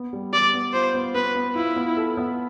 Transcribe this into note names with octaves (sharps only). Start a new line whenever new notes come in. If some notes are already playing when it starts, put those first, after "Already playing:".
Already playing: B3
G3
G3 D5
B3
F4 C5
B3
B3 B4
B3
E4 F4
B3
A4
B3